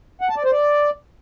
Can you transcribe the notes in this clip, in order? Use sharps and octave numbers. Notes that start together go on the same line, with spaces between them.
F#5
A5
D5
C5
D5